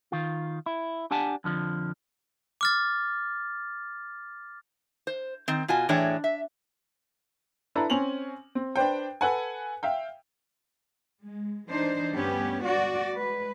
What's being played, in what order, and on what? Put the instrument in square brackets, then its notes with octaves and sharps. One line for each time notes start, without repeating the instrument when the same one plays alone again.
[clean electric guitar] D#3 F4
E4
D4 G4 F#5 G#5 A5
F2 D3 F3
[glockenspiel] D6 F6 A6
[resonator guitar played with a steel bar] C5
D#3 C4
B2 F4 F#4 G#5
A2 E3 D4 G#4 C#5 G5
E5
[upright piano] D4 E4 A4 B4 A#5
C4 C#4 G#5 F7 F#7
C4
D4 B4 C5 G5
A4 B4 F#5 G#5
E5 F5 G5
[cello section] G#3
E3 D4 D#4 C5
D2 G2 G3 B3 C#4 G4
F#4 D5
G#3 B4